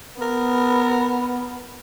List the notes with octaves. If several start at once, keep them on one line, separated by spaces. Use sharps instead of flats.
B3 A#4